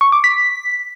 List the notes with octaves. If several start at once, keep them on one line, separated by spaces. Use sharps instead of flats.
C#6
D6
B6